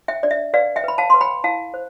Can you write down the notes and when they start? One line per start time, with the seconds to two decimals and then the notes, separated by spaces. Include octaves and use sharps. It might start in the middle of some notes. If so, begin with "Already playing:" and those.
0.08 E5 G5
0.23 D4 D5
0.31 E5
0.54 B4 D5 F5
0.76 E5 G5
0.84 B4 B5
0.98 F5 A5
1.10 B4 C6
1.21 G5 B5
1.44 E4 F5 A5
1.74 C5